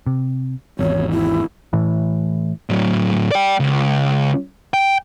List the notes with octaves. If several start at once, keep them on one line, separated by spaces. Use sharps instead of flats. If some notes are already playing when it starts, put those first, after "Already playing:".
C3
G#1 E2 C#5
E4
A2 E3
A2 F#3
D5 G5
C#2
G5